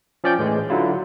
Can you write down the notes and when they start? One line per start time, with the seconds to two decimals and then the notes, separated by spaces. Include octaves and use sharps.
0.24 F3 C#4 D5 G5 G6
0.39 A2 E3 G#3
0.70 D3 F#3 E4 F4